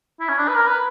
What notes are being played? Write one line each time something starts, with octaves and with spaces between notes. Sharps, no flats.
E4
C#4
D4
B4
A#4
B4